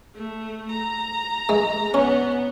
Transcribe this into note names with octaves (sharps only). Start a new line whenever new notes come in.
A3
A#5
G#3
B3 C#4